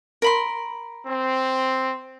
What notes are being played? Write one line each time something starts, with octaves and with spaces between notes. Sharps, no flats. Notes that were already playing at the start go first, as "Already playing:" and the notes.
A#4 B5 C6
C4